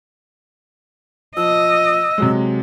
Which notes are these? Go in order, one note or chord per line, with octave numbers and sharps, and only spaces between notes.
F3 D#5 E6
C3 F#3 G#3